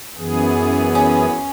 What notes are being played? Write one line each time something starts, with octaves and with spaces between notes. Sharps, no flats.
F#2 E3 B3 G#4
C#4